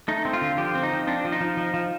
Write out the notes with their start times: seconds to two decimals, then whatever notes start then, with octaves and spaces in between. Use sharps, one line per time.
0.08 A3 D#4
0.25 C4
0.33 F4
0.41 D3
0.57 F3 G4
0.75 C4
0.83 D#4
0.92 F3
1.07 C4 D4
1.25 F3
1.32 D#4
1.41 F3
1.57 F3
1.74 F3